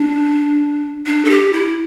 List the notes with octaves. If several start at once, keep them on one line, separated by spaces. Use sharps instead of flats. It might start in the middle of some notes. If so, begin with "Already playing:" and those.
Already playing: D4
D4
A4
G4
E4